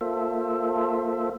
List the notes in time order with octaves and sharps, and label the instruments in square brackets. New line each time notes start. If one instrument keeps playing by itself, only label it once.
[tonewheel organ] A#3 F4 A4 C5 E5